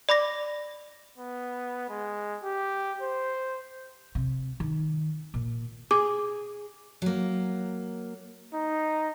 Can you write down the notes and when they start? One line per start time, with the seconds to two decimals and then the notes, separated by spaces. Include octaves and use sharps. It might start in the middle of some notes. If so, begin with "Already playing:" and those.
0.09 D5 B5 D6 A#6
1.18 B3
1.89 G#3
2.44 G4
3.02 C5
4.15 C3
4.60 D#3
5.34 A#2
5.91 G#4 D6
7.02 F#3 A#3
8.53 D#4